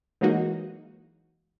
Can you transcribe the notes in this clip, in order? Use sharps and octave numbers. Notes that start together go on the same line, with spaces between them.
E3 F#3 G#3 A#3 D#4 F#4